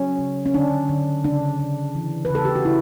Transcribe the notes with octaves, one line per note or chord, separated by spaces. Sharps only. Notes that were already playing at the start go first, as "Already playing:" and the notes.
Already playing: F#3 C#4
C#3
C#4
D3 D4
D3
C#3 D4
C#3
E3
B4
C#3 A4
G4
F#4
C#3 E4